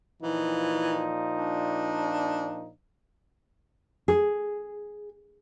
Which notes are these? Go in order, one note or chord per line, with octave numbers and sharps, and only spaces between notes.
A#2 E3 F3 D#4
D4
G#4